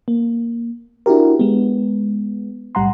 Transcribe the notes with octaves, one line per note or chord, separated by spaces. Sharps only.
A#3
D4 E4 F#4 G4 A#4
G#3 B3
B1 A2 G3 F#5 A#5 C6